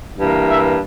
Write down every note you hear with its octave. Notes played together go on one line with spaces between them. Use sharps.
G2 E3 A#3
E5